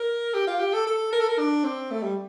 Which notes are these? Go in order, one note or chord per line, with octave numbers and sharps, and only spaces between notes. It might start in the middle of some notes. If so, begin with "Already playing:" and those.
Already playing: A#4
G4
F4
G4
A4
A4
A#4
A4
A#4
D4
C4
A3
G3